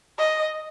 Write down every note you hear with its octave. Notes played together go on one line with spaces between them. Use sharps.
D#5